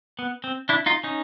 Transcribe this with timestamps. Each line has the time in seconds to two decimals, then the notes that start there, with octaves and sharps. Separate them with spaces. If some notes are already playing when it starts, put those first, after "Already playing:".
0.19 B3
0.44 C4
0.69 D4 E4
0.86 D#4 F4
1.04 C#4 D#4